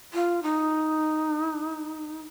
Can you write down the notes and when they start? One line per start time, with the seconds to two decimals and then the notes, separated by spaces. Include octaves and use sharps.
0.14 F4
0.43 D#4